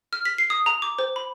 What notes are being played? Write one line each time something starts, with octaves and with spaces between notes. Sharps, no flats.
F6
B6
C7
D#6
A#5
D6
C5
B5